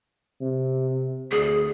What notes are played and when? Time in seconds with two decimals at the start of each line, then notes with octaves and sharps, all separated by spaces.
0.42 C3
1.31 D2 G#4